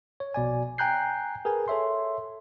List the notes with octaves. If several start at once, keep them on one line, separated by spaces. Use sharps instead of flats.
C#5
A#1 B2 D5 G#5
G5 G#5 A#5 F#6 G6 C7
G#4 A#4 B4 G#5
A4 C#5 E5 C6